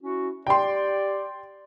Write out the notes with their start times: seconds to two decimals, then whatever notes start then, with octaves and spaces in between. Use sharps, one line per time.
0.03 C#4 E4 F#4
0.47 G4 D5 G5 C6